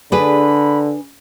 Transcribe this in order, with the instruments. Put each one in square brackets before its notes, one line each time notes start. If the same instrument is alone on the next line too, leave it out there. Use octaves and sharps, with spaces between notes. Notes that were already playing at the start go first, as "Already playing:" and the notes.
[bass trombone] D3 [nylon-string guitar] D4 G#4 B4 [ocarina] B5